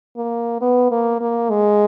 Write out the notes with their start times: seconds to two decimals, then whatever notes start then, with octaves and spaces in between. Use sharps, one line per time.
0.17 A#3
0.61 B3
0.91 A#3
1.21 A#3
1.50 G#3